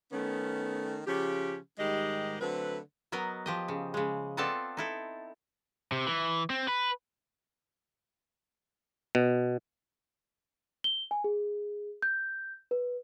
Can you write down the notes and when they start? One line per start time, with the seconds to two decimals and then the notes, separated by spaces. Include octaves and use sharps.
0.12 D#3 A3 B3 C#4
1.07 C#3 F3 C#4 G4
1.79 G#2 D#3 G3 G#3 G4 D#5
2.41 D3 F#3 A3 C4 B4
3.12 F#3 B3 A#4 D#5
3.46 F3 G4 D#5
3.68 C#3
3.94 C#3 G#3
4.37 B3 C4 F4 A4 D5 A5
4.77 D#4 E4 A4
5.92 C3
6.07 E3
6.50 C4
6.68 B4
9.15 B2
10.84 G7
11.11 G#5
11.24 G#4
12.02 G6
12.71 B4